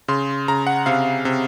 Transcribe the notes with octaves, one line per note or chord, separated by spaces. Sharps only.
C#3 C6
C#3 A#5
F#5
C3 F5
C3